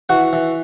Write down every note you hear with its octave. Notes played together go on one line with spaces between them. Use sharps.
E3 F#4 F#5
E3